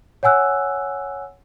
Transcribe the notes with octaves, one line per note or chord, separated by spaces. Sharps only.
C#5 F#5 G#5 E6 F#6